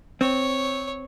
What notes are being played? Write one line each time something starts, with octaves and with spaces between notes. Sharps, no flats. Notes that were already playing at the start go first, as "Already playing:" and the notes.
C4 C#5